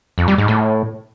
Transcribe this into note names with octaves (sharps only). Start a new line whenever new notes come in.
F2
G3
G#2
A2